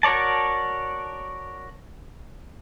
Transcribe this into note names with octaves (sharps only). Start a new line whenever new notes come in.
F#4 A#4 C#5 D5 A5